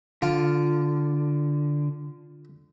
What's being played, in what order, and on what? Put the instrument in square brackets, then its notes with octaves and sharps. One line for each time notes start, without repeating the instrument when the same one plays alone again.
[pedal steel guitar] D3 [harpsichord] F4